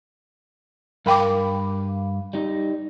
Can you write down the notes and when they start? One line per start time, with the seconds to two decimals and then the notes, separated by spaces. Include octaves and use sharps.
1.06 G2 A#4 F5 G5 B5 D6
2.33 G3 D#4